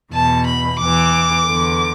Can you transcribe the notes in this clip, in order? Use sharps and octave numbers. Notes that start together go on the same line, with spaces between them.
E2 B2 A5
B5
E2 E3 D6
E2 D3